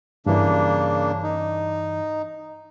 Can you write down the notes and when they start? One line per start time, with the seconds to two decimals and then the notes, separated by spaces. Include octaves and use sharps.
0.26 G2 C#3 E3 A#3 D4
1.23 D#4